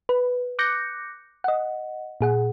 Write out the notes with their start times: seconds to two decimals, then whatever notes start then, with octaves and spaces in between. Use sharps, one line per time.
0.09 B4
0.59 D6 F#6 G6 A#6 C#7
1.44 D#5 F#5
2.21 A#2 G#4 F#5